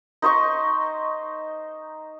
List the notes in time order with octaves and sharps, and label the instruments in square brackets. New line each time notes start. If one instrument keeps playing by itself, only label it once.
[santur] D#4 C5 D#5 C#6